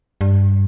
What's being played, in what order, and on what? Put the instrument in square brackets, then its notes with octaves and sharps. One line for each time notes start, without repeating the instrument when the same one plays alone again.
[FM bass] G2